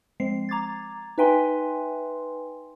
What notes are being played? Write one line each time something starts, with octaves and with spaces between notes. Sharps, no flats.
F3 G#3 C4 C7
A#5 D6 G#6 A6
D#4 B4 E5 G5 G#5 C6